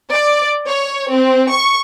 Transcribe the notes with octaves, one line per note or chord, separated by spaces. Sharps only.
D5
C#5
C4
C#6